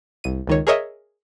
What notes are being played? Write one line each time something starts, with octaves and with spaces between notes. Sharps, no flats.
C2 D#7
C#2 D#3 C#5
G#4 A#4 C#5 D#5 E5